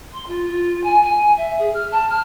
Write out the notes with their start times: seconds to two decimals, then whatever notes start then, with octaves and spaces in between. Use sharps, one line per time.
0.13 C6
0.27 F4
0.48 F4
0.84 G#5
1.02 G#5
1.37 E5
1.59 G#4
1.74 F6
1.92 A5
2.10 F6